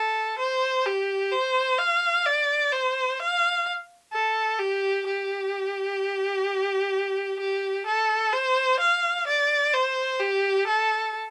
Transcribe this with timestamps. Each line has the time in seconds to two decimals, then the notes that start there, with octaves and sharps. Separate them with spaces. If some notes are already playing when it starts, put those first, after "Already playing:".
Already playing: A4
0.38 C5
0.85 G4
1.32 C5
1.78 F5
2.26 D5
2.72 C5
3.19 F5
4.12 A4
4.59 G4
5.06 G4
7.39 G4
7.86 A4
8.33 C5
8.79 F5
9.27 D5
9.74 C5
10.19 G4
10.67 A4